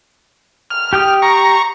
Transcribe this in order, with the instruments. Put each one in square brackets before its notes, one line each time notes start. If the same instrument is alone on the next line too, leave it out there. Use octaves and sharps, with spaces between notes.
[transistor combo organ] F6
[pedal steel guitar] G4 G5 D#6
[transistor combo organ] A#5 C#6